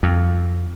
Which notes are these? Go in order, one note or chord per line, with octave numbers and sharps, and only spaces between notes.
F2